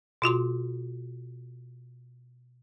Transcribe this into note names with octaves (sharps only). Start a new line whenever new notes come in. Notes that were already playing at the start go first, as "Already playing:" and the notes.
B2 F4 F#4 C6